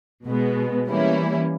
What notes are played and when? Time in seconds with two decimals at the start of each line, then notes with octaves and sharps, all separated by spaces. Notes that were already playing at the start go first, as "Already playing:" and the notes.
0.26 B2 G#3 B3
0.87 E3 G3 A#3 C#4 E4